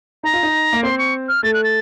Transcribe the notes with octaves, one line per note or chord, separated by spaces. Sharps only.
D#4 A#5
F4
D#4
A#3
C4 C6
C#6
F6
A3 A6
F#6
A6